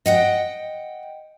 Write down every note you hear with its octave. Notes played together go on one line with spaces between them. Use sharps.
D#5 F#5 G5